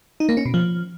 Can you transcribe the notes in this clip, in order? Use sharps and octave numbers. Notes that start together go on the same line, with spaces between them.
D#4
A#3
C#4
B2
F3